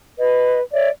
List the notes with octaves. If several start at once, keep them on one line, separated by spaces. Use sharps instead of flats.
B4 D#5
C#5 D5 E5